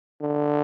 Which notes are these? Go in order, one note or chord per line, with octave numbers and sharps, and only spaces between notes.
D3